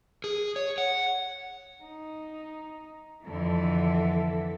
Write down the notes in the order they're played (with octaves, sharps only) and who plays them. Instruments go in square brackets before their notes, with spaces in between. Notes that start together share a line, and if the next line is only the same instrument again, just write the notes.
[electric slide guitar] G#4
C#5
F#5
[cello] D#4
[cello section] F2 D3 [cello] E3 A4